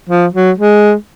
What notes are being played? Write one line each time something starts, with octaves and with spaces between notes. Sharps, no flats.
F3
F#3
G#3